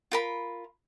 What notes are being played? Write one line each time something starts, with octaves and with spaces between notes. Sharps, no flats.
F4 A#4 B5